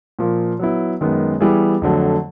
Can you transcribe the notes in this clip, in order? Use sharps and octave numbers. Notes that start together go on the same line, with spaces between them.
A#2 F3 A#3
F#3 B3 E4
F#2 D#3 G#3 B3
E3 G3 B3 E4 G#4
F2 D3 F#3 A3